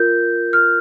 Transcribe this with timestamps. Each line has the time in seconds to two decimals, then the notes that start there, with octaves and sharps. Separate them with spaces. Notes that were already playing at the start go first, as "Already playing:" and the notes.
Already playing: F4 A#4 G6
0.53 F6